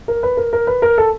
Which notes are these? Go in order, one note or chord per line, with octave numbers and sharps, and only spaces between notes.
A#4
B4
A#4
A#4
B4
A#4
A4